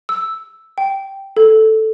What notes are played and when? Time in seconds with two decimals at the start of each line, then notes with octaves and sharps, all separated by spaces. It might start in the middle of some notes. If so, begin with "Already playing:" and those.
0.09 E6
0.78 G5
1.37 A4